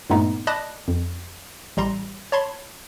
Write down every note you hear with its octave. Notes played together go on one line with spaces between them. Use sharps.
G2 A#2 A3 B3 D#4
D5 D#5 A5 B5 F#6 A#6
F2
A1 G3 A#5 C6
C#5 A5 B5 C6 G#6